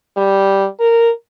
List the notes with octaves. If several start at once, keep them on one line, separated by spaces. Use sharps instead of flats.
G3
A#4